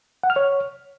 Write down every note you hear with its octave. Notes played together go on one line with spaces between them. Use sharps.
F#5
F6
C#5